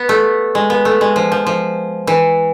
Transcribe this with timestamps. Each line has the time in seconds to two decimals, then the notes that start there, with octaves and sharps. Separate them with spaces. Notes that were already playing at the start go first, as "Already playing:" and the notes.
Already playing: B3
0.09 A3
0.55 G#3
0.70 B3
0.85 A3
1.01 G#3
1.16 F3
1.32 F3
1.47 F3
2.07 E3